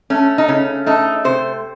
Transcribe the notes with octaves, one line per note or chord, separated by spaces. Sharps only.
A3 C#4
D#4
C#3 C#4
A3 D#4
C3 C5